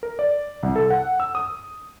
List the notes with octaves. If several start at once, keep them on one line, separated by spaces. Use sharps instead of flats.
A#4
D5
C2
A4
F#5
E6
D#6